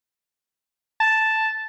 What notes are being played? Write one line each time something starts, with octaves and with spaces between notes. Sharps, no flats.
A5